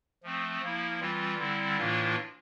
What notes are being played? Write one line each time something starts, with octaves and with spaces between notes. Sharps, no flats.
F3 A3 C4
F3 A#3 E4
E3 G3 C4 F4
D3 G3 C4 E4
A2 E3 A#3 D4 F4